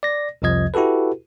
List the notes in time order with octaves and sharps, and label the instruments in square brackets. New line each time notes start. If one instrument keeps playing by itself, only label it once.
[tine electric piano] D5 A#6
C2 F2 C3 F3 D#5 G#6
E4 F#4 G4 A4 B4